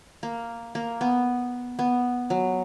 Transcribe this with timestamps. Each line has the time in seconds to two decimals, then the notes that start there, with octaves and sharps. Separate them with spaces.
0.23 A#3
0.75 A#3
1.01 B3
1.79 B3
2.30 F#3